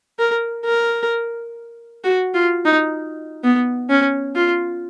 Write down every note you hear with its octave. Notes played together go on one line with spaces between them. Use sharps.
A#4
A#4
F#4
F4
D#4
B3
C#4
F4